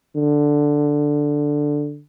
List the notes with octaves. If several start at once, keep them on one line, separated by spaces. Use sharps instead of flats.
D3